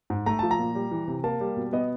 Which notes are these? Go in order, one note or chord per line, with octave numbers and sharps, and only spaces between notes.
G#2
A3 A#5
F3 A5
A#5
A#2
G3
E3
C3
A#3 A5
G3
B2
B3 D#5